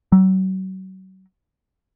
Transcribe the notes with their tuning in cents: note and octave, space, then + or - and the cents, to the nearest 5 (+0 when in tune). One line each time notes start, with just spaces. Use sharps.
F#3 +35